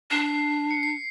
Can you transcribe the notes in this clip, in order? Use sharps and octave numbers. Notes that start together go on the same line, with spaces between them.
D4 C7
C#7
C7